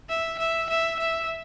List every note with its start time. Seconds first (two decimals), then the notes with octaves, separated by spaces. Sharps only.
0.09 E5
0.39 E5
0.70 E5
0.99 E5